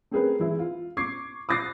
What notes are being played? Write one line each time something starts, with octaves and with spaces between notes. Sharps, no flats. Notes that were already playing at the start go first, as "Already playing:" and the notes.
A3 C4 C#4 G#4 A#4 B4
E3 G#3 E4
F4
C#6 D6 G#6 C7
D6 D#6 F#6 A6 A#6 C7